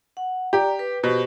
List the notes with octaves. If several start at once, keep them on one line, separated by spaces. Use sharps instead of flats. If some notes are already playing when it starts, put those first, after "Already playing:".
F#5
G4 D5 A#5
B4
B2 G4 C5